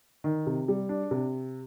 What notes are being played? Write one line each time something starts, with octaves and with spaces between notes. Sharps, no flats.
D#3
C3
G3
D4
C3